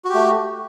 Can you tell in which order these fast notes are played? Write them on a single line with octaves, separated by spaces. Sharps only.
F#4 G4 A3